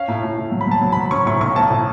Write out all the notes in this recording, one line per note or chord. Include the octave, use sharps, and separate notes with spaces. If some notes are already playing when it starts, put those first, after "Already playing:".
Already playing: C#4 F5
A2
A2
A2
F#3
B5
F#3 A5
F#3
F#3 B5
C#4 C#6
A2 C#6
B1 C#6
B1 A5
A2